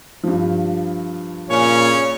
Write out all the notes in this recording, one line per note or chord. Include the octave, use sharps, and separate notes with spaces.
G2 F3
A#2 C#3 C#4 C#5